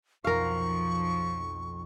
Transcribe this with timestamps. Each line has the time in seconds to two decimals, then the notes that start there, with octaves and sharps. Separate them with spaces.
0.24 B1 F2 F3 D#4 A#4 F5 C#6